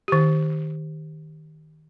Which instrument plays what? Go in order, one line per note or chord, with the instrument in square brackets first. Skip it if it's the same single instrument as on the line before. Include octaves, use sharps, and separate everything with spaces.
[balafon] D#3 G4